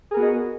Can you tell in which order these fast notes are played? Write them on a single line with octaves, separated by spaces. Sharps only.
G#4 A#4 B3 F#4 D#5